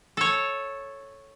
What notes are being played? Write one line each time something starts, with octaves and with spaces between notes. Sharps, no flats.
A4 C#5